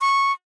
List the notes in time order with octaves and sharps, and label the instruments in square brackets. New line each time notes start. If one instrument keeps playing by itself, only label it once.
[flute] C#6